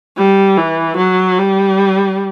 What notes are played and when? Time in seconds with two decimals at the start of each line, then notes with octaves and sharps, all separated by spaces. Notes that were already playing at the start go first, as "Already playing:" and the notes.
0.17 G3
0.57 E3
0.97 F#3
1.38 G3